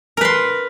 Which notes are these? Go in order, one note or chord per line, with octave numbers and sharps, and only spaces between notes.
A#4 B4 C6